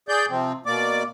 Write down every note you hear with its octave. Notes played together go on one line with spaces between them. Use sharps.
G#4 D5 G6
C3 F3 C4
B2 A#3 D5 D6